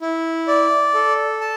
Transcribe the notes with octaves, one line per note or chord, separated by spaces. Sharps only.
E4
D5
A4
A5